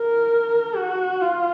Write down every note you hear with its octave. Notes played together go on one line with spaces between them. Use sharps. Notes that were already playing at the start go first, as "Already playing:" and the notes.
Already playing: A#4
F#4
F4